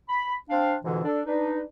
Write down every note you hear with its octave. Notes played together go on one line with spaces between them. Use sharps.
B5
C4 D4 F5
F2 G#2 B2 D3 E3
D4 A4
D4 D#4 B4